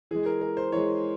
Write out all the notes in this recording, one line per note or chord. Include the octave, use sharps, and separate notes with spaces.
E3 G#3 G#4
A#4
A#4
C5
E3 G#3 C#5